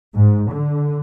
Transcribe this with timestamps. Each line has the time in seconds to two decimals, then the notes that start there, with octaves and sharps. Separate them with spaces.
0.15 G#2
0.50 D3